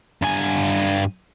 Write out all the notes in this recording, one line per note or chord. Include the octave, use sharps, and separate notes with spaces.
G2 G#5